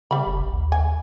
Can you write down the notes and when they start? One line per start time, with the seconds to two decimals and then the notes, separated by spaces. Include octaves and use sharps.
0.11 C#3 G3 B5
0.26 F1
0.38 A1
0.53 D#2
0.72 G#5